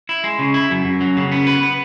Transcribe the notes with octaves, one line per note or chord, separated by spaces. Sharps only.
E4
G#3
C#3
E4
F#2
F#2
F#3
C#3
B3
B4
B3